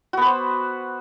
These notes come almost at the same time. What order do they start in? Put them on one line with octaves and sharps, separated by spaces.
F#4 B3 B4 C5